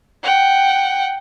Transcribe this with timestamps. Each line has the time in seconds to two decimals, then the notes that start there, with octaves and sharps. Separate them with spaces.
0.23 F#5 G5